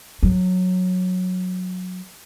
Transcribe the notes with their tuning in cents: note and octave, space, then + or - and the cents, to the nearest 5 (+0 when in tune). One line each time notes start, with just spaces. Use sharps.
F#3 -15